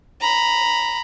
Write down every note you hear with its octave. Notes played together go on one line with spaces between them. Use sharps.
A#5 B5